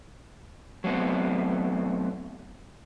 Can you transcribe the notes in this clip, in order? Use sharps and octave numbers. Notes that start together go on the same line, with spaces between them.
F#3 A3 B3 C4